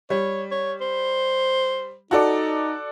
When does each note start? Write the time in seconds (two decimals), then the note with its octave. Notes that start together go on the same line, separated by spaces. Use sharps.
0.10 G3 C#5
0.51 C#5
0.81 C5
2.11 D#4 F#4 A4 D5